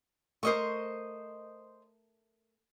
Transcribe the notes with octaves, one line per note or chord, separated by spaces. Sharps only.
A3 A#4 C5 D#5 C#6